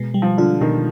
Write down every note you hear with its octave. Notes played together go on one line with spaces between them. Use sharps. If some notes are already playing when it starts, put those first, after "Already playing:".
Already playing: B2 G#3
G3
F3
D3 F4
B2 D#3